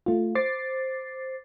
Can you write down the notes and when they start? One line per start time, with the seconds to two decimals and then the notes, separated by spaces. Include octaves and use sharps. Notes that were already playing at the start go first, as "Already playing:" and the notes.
0.06 A3 F4
0.35 C5 D6 A6 C7